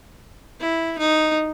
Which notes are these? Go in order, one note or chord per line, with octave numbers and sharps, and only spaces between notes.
E4
D#4